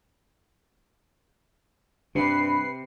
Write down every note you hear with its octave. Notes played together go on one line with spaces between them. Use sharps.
G2 C3 B4 C7